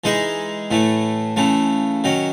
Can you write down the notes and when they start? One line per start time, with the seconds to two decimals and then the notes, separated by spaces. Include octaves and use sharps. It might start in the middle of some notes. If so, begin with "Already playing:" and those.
0.04 E3 G#3 D#4 G#4 D#5
0.71 A2 E3 A3
1.36 C#3 E3 A3
2.04 D#3 F#3 C#4